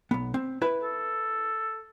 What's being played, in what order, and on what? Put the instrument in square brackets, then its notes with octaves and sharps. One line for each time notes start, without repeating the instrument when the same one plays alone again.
[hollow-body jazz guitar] B1 B3
C4
E4 B4 B5
[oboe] A4